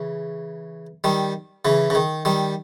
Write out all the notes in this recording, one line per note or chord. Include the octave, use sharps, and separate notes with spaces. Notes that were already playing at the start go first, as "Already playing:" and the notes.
Already playing: C#3 E3
D#3 G3
C#3 E3
C#3
D#3
D#3 G3